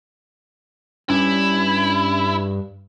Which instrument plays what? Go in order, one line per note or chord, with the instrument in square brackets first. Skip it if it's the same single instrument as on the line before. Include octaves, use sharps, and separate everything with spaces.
[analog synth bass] G2 [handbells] C#4 [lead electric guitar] E4